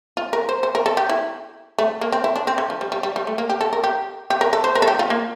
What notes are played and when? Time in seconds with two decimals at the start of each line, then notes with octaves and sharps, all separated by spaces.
0.17 F4
0.33 A#4
0.49 C5
0.63 C5
0.75 A#4
0.86 A4
0.97 G4
1.09 E4
1.78 A3
2.01 A#3
2.12 C4
2.24 E4
2.36 D4
2.47 C4
2.58 D3
2.70 F3
2.81 G3
2.92 G3
3.03 G3
3.16 G3
3.27 A3
3.38 A#3
3.49 G4
3.61 A4
3.73 A#4
3.84 G4
4.30 G4
4.41 A#4
4.53 A4
4.64 C5
4.75 A#4
4.82 A4
4.88 G4
4.99 F4
5.10 A#3